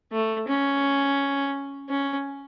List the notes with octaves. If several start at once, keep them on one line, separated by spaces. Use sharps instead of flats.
A3
C#4
C#4